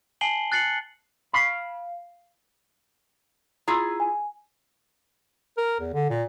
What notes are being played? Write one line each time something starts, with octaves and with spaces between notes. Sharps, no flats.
G#5 A5 C7 F#7 G7
F#6 A6 C7 C#7 F#7
F5 B5
E4 F4 G#4 A#5 E6
G#5
A#4
E2
D3
A#2